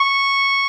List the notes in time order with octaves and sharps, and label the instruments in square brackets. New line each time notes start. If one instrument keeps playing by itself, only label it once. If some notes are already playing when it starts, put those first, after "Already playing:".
Already playing: [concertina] C#6